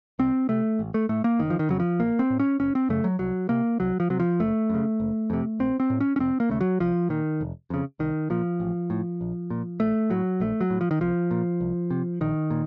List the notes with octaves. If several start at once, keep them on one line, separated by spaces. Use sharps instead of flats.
C2 C4
C3 A3
A1
A3
A2 A3
A#3
F#1 D#3
F3
D#3
F2 C#3 F#3
F3
A#1 A#3
C4
A2
C#4
F#1 C#4
C4
F#2 C#3 A3
F#3
C2 F#3
C3 A#3
C2 F#3
F3
C3 F#3
F3
F#1 A3
F#2 C#3
F#1
F2 C3
A#1 C4
C4
A2
C#4
C#4
F1 C4
A#3
D#2 C#3 A3
F#3
C2 F3
A#2 D#3
F1
F2 C#3
C2 D#3
A#2 F3
A1
A2
A#1
A#2
A#1 A3
A2 F#3
A#1 A3
F#3
A2
F3
D#3
C2 F3
A#2
C2
C3
A#1 D#3
A#2